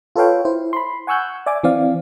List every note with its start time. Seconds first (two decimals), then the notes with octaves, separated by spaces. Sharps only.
0.16 F4 A4 B4 C#5 F5 G5
0.45 E4 C5
0.73 B5 C6
1.07 F#5 G#5 C#6 E6 F#6 G6
1.46 D5 E5 G#5 D6
1.64 E3 C4 D5 F5